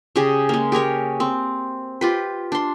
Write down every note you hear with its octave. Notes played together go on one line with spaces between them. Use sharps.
C#3 G4 G#4
G#3 A#3
G4 G#4 A#4 C#5
C4
F4 G4 B4
D4 C6